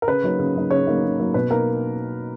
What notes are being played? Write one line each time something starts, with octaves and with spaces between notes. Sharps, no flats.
A#4
C#3 B4
F#3 A#3 D#4
C#3
F#3 A#3 D#4
C#3 C#5
F#3 A#3 D#4
C#3
F#3 A#3 D#4
B2 B4
A#3 D#4 A#4